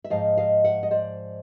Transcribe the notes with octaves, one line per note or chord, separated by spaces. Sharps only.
E5
G#2 F3 D#5 F5
D#5 F5
E5 F#5
D#5
C5 D5